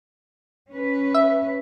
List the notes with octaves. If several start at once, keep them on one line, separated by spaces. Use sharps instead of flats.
C#4 B4
E5